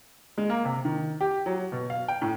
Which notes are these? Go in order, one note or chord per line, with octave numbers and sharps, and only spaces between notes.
G#3
A#3
C3
D#3
G4
F#3
B2
F5
G5
A2